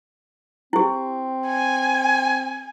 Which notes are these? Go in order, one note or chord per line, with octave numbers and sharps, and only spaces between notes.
C4 E4 G4
G#5